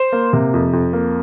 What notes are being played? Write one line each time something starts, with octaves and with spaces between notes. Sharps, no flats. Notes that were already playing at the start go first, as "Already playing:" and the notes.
Already playing: C5
A#3
C3
F2
F2
A#3